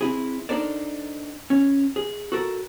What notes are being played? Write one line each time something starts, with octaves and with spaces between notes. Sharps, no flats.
C4 E4 G#4
D4 D#4 A4 A#4 C5 D5
C#4
G#4
F#4 A4 A#4